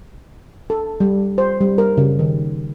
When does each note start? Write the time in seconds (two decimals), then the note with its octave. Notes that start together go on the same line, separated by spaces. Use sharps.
0.70 A4
1.00 G3
1.38 C5
1.61 G3
1.78 A#4
1.97 C#3
2.19 D#3